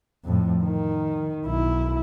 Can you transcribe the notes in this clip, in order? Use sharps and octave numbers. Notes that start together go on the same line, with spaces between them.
F2 A2
D#3
B1 E4